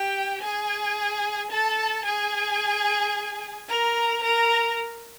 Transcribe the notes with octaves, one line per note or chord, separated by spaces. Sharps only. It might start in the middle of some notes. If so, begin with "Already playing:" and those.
Already playing: G4 G5
G#4 G#5
A4 A5
G#4 G#5
A#4 A#5
A#4 A#5